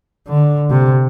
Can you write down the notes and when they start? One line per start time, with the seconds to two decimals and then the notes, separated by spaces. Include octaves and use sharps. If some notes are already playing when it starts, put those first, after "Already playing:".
0.28 D3
0.70 C3